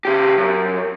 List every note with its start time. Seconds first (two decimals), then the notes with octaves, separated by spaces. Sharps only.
0.05 C#3 G4
0.37 F#2